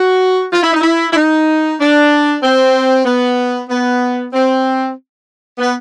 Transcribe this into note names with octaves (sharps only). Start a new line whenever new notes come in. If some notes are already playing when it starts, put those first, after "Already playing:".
Already playing: F#4
F4
E4
D#4
E4
E4
D#4
D4
C4
B3
B3
C4
B3